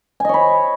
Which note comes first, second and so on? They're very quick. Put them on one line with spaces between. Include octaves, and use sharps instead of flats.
G#5 D#5 C#5 B5